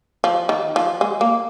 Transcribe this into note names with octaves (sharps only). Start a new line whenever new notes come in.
F3
D#3
F3
G#3
A#3